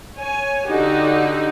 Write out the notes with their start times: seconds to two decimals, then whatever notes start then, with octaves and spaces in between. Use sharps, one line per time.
0.18 C#5 G#5
0.68 D3 D#4 F#4 G4